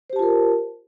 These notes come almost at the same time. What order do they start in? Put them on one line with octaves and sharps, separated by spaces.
C5 G4 A5 F4 A#4